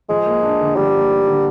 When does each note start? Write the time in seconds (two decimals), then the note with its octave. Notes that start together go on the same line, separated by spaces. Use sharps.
0.09 F3 G#3
0.26 A#3
0.43 D4
0.61 D3
0.76 F3 G3
0.94 A#3
1.11 D4
1.28 D3